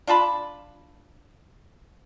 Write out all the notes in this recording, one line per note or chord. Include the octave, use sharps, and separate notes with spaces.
D4 F4 A5 B5